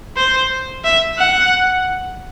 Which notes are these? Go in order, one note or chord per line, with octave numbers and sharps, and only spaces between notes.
C5
E5
F#5